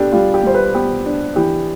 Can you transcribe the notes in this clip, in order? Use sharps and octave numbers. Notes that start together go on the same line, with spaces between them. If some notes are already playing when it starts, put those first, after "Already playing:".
Already playing: B3 D4 G4 A4
G3 F4
G4
G3 C5
B4
B3 G4
D4
E3 G4